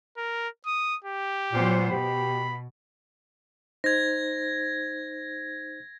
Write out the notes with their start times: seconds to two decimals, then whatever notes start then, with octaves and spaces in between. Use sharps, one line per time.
0.17 A#4
0.66 D#6
1.04 G4
1.53 A#2 F#3 B3 C5
1.91 B2 G4 B5
3.84 D#4 C5 G#6 A#6